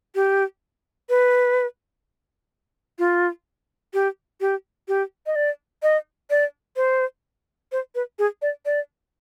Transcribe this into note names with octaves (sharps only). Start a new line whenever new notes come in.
G4
B4
F4
G4
G4
G4
D#5
D5
D#5
D5
C5
C5
B4
G#4
D5
D5